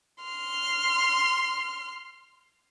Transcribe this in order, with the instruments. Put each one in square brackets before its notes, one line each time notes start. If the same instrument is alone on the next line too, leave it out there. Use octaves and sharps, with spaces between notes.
[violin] C6 F6